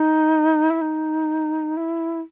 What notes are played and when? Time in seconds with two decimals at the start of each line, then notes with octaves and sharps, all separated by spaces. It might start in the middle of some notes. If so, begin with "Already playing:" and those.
Already playing: D#4
0.70 E4
0.81 D#4
1.77 E4